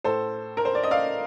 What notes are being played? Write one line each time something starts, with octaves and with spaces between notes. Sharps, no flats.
A2 A4 C5
A#4
C5
D5
D#5
D5 F5